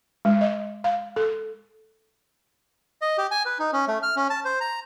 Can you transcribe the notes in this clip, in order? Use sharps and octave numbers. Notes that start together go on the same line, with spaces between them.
G#3
D#5
F5
A4
D#5
G4
G#5
B4
D#4
C#4
A3
F6
C#4
A5
C5
A#5